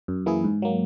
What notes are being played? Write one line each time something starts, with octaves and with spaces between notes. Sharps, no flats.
F#2
E3 A#3 E4 G#4
G#2
F#3 A#3